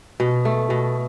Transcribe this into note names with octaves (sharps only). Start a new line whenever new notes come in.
B2
A3
B2